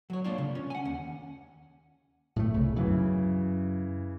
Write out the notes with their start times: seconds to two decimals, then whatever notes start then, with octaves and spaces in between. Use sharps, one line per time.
0.10 F#3 C#5
0.24 G#3 A#3 D4 F4 C#5
0.38 C#3
0.55 C#4
0.70 F#5 G#5
0.85 D#2
2.36 A2 A3
2.54 C2 C#3
2.76 F#2 C#3 E3